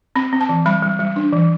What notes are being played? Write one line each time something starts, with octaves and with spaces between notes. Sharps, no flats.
C4 B5
C4
A5
E3
G3 B5
G3
G3
D4
E3